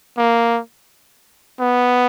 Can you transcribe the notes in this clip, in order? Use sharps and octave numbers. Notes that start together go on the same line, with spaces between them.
A#3
B3